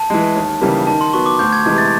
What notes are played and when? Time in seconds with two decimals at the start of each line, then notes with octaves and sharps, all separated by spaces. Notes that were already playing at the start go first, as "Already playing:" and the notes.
Already playing: A5
0.10 E3 G#3
0.35 D#2
0.62 C#3 E3 G3 A#3
0.87 D#3 A5
1.01 C6
1.13 F#3 B3 C#6
1.26 D6
1.39 D2 G6
1.53 G#6
1.65 C3 E3 G#3 G#6
1.78 A6